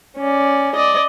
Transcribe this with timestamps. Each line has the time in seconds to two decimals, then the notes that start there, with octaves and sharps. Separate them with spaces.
0.18 C#4 D5
0.75 D5 D#5